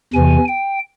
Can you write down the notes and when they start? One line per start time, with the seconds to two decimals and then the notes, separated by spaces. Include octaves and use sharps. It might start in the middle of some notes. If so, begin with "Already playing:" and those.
0.14 E2 C3 E3 G#5
0.48 G5